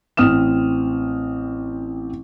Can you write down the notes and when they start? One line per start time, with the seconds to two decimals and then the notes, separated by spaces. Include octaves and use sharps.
0.17 A1 C4 D#6 F6 E7